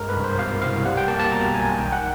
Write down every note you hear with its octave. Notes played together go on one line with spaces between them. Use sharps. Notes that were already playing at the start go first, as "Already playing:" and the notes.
Already playing: G2 G#3 A#4
B4
C2
C5
B2 F5
C2 F5
G3 F#5
G5
A#3 A5
A5
B2 A#5
B1 G#5
D#3 G5
F#5